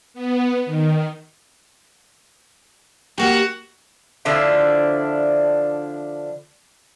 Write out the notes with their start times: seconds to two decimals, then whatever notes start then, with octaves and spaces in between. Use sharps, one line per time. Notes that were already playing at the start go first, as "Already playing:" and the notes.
0.14 B3
0.65 D#3
3.18 A#3 F#4 G4 F#5
4.25 D3 F3 D4 E4